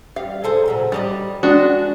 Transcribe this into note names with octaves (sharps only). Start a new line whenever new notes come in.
G3 F5
G#4 A4 C5
A#2 C#3 F#3
G3 G4 D5 D#5
G#3 D4 F#4